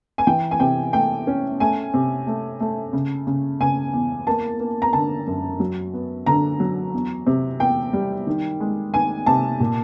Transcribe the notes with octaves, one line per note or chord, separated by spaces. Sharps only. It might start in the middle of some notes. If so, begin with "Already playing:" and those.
G#5
E3 G5
G#5
C3 G5
A3 G5
C#4
A3 G#5
C3
A3
A3
C#3
C#3
C#3 G#5
E2
A#3 A5
A#3
A#5
D3 A5
F#2
F#3
B3
D3 A#5
F#3
E2
C3
E2 G5
G3
D#3
G#3
D#3 G#5
C3 A5
A#2